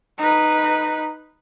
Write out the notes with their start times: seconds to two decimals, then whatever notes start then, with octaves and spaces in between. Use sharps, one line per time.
0.18 D#4 B4